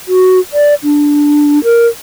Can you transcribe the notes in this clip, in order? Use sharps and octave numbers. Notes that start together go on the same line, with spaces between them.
F#4
D5
D4
A#4